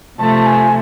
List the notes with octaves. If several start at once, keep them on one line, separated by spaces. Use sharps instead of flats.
C3 F3 A3 A5
G#5